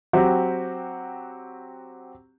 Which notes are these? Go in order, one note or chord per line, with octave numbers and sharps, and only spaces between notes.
F#3 C4 F#4 G4